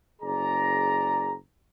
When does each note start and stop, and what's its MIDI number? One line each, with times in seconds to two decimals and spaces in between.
0.22 1.34 30
0.22 1.34 68
0.22 1.34 74
0.22 1.34 82